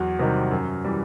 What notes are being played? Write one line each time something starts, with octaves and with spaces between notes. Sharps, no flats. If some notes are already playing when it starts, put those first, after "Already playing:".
Already playing: E2 F#3
C3 D#3 G3
F#2
E3 G3